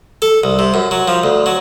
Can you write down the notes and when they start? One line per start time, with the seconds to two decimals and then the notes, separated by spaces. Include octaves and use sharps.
0.22 A4
0.44 C2
0.59 C3
0.74 F#2
0.91 F#3
1.08 F3
1.24 D2
1.46 F#3